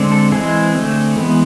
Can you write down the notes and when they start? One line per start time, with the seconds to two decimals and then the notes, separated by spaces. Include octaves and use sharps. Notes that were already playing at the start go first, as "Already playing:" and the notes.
Already playing: D3 G#3 C4
0.12 A4
0.32 E3 G#3 C4 G#4
0.75 D3 A3 C4
1.16 E3 G#3 B3